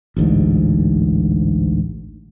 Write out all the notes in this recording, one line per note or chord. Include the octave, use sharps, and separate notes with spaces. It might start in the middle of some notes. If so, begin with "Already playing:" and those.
A1 D2 G#2